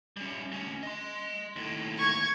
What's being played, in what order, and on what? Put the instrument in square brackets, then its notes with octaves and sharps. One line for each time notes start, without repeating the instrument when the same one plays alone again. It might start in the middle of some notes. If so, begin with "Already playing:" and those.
[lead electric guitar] G3 C#4
D2 C#4
D#5 C6
D#2 A2
[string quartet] C#6 G#6